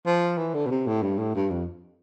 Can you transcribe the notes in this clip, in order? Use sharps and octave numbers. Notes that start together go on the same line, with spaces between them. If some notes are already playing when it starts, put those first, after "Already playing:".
F3
E3
D3
B2
C3
A2
G2
A2
G2
F2